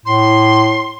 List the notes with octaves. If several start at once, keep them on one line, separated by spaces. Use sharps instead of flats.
A2 C6